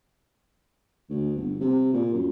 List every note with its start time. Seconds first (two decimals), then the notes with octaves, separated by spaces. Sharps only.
1.10 D2
1.36 G1
1.61 C3
1.93 A#2
2.13 F#2